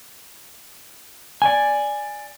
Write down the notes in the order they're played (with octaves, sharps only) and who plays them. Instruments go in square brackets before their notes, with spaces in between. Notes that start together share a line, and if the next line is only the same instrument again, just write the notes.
[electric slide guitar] D5 G#5